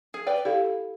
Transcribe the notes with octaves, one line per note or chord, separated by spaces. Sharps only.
G#4
B4 D5 G5
E4 G4 A4 F5